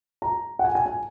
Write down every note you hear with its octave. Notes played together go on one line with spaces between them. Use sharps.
A#5
F#5
G#5
G#5
G#5